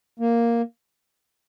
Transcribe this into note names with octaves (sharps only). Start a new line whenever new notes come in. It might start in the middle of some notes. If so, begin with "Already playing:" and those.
A#3